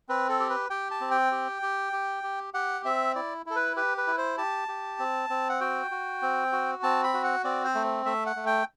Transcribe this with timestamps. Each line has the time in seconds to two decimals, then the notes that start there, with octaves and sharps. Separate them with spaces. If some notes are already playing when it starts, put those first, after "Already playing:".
0.09 C4 B4
0.29 A4
0.40 G4
0.49 B4
0.70 G4 G5
0.91 A5
1.01 C4
1.11 G5
1.31 G4
1.62 G4
1.93 G4
2.23 G4
2.54 G4 F#5
2.85 C4 E5
3.15 E4 D5
3.46 E4 A4
3.56 B4
3.76 G4 B4
3.98 B4
4.07 E4
4.18 C5
4.38 G4 A5
4.68 G4
4.99 C4
5.30 C4
5.49 F#5
5.61 F#4 G5
5.91 F#4
6.22 C4
6.52 F#4
6.83 C4 A5
7.04 B5
7.14 F#4
7.24 F#5
7.44 C4 D5
7.64 C5
7.75 A3
8.05 A3 E5
8.26 F#5
8.36 A3
8.46 G5